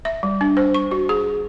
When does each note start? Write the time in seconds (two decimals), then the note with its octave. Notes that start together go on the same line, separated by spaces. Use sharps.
0.05 E5
0.23 G3
0.41 D4
0.57 C5
0.74 C#6
0.91 F#4
1.09 G#4